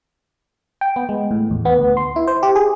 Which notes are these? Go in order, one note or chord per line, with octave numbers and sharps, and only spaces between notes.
G5
B3
G#3
A2
E2
B3
D2
C6
E4
C5
G4
G#4